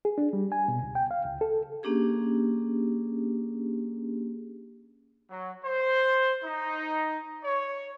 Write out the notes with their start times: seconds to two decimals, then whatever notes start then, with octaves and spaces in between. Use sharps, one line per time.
0.05 G#4
0.18 D4
0.33 G3
0.52 G#5
0.68 B2
0.83 C#2
0.95 G5
1.11 F5
1.24 C#2
1.41 A4
1.83 A#3 C#4 D4 G4 G#4
5.29 F#3
5.65 C5
6.43 D#4
7.43 C#5